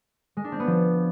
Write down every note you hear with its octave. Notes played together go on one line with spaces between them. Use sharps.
G#3
D4
C4
B3
F3